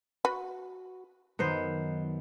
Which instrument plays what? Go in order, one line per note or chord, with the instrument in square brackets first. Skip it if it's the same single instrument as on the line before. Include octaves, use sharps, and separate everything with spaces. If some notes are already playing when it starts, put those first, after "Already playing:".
[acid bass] F#4 [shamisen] B4
[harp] F#2 D#3 [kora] B3 C5 [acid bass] D#4